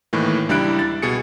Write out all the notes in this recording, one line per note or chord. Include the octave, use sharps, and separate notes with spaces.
A2 D#3 E3 A#3
C#2 G3 D4 E4 F#6 D7
A6
B2 G#4 C#7